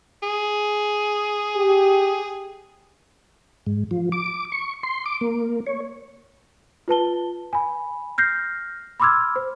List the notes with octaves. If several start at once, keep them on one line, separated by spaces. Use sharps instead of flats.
G#4
G4
G#2
F3
D6
C#6
C6
D6
A#3
C#5
F4 B4 A5 G7
G#5 B5
F6 G6 A#6 C7
B5 C6 D6 E6 F6 G#6
C5